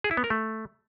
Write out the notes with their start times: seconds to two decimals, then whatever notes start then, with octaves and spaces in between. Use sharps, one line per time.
0.04 G#4
0.11 E4
0.17 B3
0.24 A#4
0.30 A3